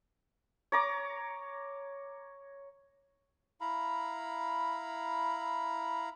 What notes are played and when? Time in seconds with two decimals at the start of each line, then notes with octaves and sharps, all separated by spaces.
0.72 C#5 A#5 D6
3.61 E4 F5 A#5 B5